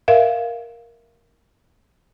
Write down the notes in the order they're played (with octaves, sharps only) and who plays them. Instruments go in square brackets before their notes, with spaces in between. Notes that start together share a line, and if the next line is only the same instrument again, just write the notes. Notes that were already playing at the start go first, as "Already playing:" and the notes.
[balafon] A#4 E5 F5